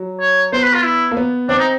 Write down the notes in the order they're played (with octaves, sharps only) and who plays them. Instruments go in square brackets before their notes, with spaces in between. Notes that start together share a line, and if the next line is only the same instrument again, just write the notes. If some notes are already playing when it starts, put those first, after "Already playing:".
Already playing: [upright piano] F#3
[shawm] C#5
[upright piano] B3 [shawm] C5
[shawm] B4
F4
E4
[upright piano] A#3
B3
[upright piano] C4 [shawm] D4
[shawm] D#4